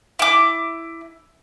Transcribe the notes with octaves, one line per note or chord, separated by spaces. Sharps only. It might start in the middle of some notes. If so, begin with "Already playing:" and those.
E4 D6